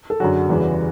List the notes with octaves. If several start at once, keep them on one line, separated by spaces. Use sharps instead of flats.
A4
F#2 D3 F#3 F#4 G#4
E2 C#3 E3 G3